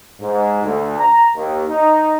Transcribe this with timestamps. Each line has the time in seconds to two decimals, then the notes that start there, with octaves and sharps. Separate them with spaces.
0.20 G#2
0.64 D2
0.99 A#5
1.36 D#2
1.69 D#4